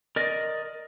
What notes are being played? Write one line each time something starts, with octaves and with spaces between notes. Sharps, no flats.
A#4 D5 D#5